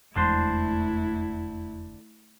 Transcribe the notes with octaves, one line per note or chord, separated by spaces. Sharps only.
F1 E2 D3 G#3 A3 D4 E4 C5